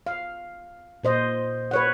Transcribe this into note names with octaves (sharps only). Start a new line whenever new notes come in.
F5
A#2 C5 D#5
B4 C#5 F#5